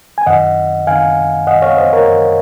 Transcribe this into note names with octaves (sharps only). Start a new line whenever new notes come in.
G#5
F#2 D#3 D#5 F#5
F#2 D#3 F5 G#5
F#2 D#3 D#5 F#5
C#5 F5
C5 D#5
A#4 C#5
F#2 D#3